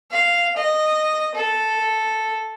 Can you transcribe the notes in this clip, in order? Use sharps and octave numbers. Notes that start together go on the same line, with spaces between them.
F5
D#5
A4